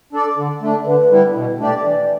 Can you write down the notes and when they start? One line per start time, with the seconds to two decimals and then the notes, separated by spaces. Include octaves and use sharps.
0.13 D4 A4 D5
0.37 D3
0.62 A3 D4
0.85 D3 B4
1.10 G3 B3 E4
1.35 B2
1.59 A3 D4 G4 D5
1.84 E3 D5